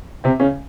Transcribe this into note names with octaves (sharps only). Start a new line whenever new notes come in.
C3 C4
C#3 C#4